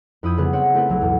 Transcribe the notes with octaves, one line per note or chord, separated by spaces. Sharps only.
F2 E4 B5 D#6 G6 G#6
C#3 G3 B3 G#4 B4
C4 C#5 F#5
A3 C4 E4 A4 B4
B1 F#3 G#6
E2 A2